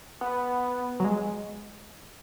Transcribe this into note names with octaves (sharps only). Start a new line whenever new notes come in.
B3
F#3
G#3